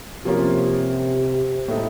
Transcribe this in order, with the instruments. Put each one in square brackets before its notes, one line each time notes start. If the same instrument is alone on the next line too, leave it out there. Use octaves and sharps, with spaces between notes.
[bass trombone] C3 [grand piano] F3 A#3 C#4 F4
[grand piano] A2 A3 D#4 A4